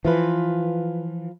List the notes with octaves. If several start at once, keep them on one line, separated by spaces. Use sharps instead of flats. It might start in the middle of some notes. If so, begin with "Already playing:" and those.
E3 F3 F4 B4